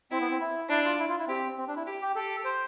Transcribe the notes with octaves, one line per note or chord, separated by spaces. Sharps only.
C4 E4
B3
C4
E4
D4 E4
F4
E4
F4
E4
C4 G4
C4
D4
E4
G4
G4
G4 A4
C5